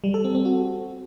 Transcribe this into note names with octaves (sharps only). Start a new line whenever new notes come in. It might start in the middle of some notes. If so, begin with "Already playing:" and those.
G3
A4
C4
C4
F#4